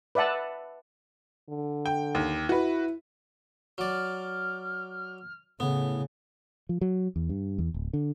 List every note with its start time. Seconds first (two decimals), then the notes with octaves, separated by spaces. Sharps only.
0.15 B4 D5 E5 F#5 A5
1.49 D3
1.86 G5
2.15 D#2
2.49 E4 F#4 B4
3.78 F#3 D5 F6
5.60 A2 C#3 B3
6.69 F3
6.81 F#3
7.16 E2
7.29 G2
7.58 E2
7.74 D1
7.93 D3